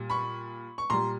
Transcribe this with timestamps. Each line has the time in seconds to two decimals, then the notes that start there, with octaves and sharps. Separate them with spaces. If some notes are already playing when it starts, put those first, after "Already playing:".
Already playing: A#2 G3
0.10 B5 C#6
0.78 C#6
0.90 A#2 G3 A#5 C6